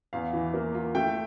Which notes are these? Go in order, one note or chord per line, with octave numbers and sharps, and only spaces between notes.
E2 F5
E3
A#3
F4
A3 G5